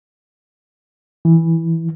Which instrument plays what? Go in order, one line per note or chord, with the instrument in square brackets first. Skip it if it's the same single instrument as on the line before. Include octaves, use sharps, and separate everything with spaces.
[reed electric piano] E3